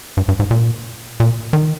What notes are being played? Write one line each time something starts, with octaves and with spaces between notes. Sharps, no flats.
G2
G2
G#2
A#2
A#2
D#3